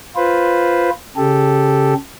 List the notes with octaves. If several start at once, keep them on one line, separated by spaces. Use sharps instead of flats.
F4 B4 C5
C#3 G4 A4